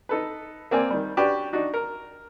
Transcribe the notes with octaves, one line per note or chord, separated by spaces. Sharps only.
D#4 A4 B4
A#3 C4 D5 G#5
D#3 G3
C#4 D4 F#4 G4 B4 D5
D4 D#4 F#4
A#4